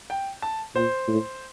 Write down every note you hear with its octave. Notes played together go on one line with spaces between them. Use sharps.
G5
A5
A#2 C5
A2